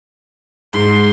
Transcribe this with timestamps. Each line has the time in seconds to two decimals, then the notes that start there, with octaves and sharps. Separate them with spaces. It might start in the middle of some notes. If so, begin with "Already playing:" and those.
0.74 G#2 C6